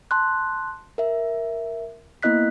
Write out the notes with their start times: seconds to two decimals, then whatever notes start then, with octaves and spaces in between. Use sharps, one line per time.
0.11 A5 C6 F#6
0.98 A#4 E5
2.23 A#3 B3 E4 D#5 F#6 B6